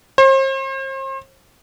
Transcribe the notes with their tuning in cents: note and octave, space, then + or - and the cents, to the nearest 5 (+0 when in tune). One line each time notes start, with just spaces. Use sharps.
C5 +40